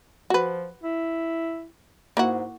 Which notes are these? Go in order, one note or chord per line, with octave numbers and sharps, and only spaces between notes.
F3 F#4 B4
E4
G#2 A#3 E4 F#4